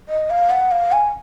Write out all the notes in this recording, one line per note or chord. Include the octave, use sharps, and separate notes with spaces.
D#5
F5
F#5
F5
G#5